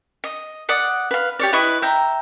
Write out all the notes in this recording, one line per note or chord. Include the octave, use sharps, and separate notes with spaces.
D#5
D5 F#5 D#6
B4 F5
G4 C#5 D5
E4 B4 D#5 C#6
E5 G5 A#5